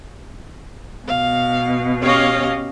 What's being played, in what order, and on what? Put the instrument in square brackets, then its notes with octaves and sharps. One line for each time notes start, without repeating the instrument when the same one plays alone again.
[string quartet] B2 [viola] F5
[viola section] C#4 C#5 F5 [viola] G4 D#5